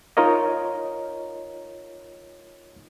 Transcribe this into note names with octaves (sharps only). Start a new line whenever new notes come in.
D#4 F4 A#4 C#5 D#5